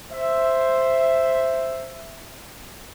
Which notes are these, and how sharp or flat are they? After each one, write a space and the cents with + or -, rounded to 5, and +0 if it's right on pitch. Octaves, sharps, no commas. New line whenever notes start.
C5 +0 E5 +5